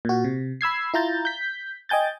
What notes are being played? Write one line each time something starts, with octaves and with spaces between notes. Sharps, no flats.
A#2 F#4
C3
B5 E6 G#6 C7
E4 F4 A#5 G6 A6
G6 B6
D#5 G5 G#5 G6 A6